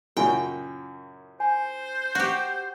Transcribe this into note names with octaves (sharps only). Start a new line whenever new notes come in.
F#2 A#2 C#3 E4 G5 G#5
C5 G#5
F#4 G4